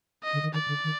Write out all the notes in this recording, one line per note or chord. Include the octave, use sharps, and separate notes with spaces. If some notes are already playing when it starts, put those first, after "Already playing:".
D#5
D3
D#3
D#3 D5
D3
D#3